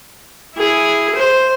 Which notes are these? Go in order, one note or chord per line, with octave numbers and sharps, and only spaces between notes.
E4 G#4
C5